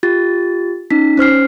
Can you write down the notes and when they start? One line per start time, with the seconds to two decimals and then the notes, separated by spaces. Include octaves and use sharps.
0.03 F4 G4 A6
0.90 C#4 D#4 B6
1.17 C#4 C5 F6 C7